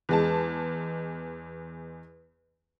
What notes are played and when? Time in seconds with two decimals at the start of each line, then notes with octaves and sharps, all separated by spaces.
0.09 E2 G#3 A5